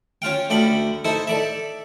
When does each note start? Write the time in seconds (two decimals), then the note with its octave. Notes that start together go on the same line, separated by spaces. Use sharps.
0.22 C#4 F4 F5 G5
0.50 D2 D3 D5 G5 B5
1.05 D#4 E4 A4 C5
1.27 A4 D5 E5